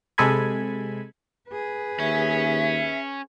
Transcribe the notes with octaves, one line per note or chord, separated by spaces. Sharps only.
C3 G#3 A4 G#5 B5 G#6
G#4 B4
D#2 C#4 E5